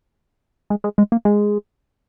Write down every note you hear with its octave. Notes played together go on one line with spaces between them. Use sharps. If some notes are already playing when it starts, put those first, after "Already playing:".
G#3
G#3
G#3
A#3
G#3